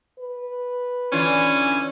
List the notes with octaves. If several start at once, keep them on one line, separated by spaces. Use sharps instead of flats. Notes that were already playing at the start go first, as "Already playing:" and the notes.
B4
D3 E3 C#4 F4